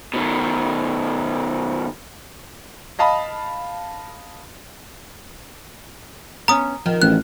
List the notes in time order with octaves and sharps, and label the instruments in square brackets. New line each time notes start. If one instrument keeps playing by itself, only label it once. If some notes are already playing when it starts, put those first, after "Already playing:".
[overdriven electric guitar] B2 D#3
[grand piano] D#5 F5 A5 B5
[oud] B3 C#4 [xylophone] A#5 D#6
[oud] D#3 [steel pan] F3
[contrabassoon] A1 [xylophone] F#6